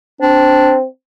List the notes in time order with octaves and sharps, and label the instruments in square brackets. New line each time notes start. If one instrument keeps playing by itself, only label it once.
[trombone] C4 [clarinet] D4